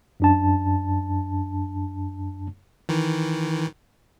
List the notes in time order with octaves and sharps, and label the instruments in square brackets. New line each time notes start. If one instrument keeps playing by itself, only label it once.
[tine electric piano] F#2 D4 A5
[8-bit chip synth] D#3 E3